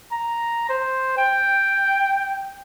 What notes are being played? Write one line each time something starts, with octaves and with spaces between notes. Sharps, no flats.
A#5
C5
G5